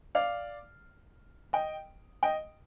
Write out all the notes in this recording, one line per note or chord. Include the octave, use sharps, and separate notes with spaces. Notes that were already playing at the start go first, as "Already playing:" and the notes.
D5 F5
D#5 G5
D#5 G5